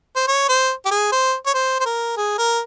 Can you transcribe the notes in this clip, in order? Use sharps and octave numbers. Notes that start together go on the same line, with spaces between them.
C5
C#5
C5
G4
G#4
C5
C#5
C5
C5
A#4
G#4
A#4